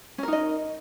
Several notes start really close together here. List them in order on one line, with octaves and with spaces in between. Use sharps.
C#4 A#4 D#4 D#5